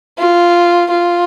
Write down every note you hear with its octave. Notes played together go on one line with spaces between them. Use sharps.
F4
F4